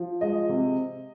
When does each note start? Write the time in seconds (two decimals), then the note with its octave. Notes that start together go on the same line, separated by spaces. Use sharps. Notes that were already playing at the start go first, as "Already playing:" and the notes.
Already playing: F3
0.21 G#3 D#5
0.49 C3